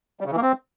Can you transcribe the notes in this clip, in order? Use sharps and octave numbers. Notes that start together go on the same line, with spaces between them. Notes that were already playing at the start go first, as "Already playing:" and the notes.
G3
C#3
E3
A#3
C4